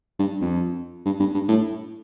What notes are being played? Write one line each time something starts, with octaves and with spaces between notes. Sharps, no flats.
G2
F2
G2
G2
G2
A2